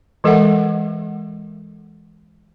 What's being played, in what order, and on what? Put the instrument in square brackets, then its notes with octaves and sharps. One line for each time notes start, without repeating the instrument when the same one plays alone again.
[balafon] E3 G#3 A4 A#4 E5 F#5